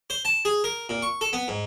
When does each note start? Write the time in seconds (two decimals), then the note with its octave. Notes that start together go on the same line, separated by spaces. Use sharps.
0.10 C5
0.25 A5
0.45 G#4
0.64 A#4
0.89 A#2
1.02 C#6
1.21 A4
1.33 B3
1.48 G#2